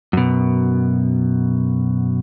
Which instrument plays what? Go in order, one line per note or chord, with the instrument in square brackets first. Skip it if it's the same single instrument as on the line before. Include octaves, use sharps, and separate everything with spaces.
[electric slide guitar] F#2 B2